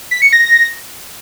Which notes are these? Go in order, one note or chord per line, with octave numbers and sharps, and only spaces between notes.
B6
C#7
A#6